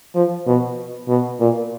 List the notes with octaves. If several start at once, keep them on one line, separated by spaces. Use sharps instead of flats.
F3
B2
B2
A#2